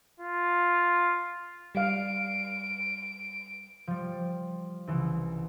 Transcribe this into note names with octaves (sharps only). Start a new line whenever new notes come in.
F4
G3 F5 D7
F3 G3
C2 C#3 E3